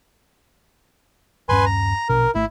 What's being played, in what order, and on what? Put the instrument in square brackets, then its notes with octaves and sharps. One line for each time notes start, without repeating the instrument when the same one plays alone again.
[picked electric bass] D#1 G2 C#4 [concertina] B4 G#5 C6
[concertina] A#5
[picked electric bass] A#1 B2 D4 [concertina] A#4
[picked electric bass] G#1 A3 [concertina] E4